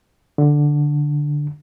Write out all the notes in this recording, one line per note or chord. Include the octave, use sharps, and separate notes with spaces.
D3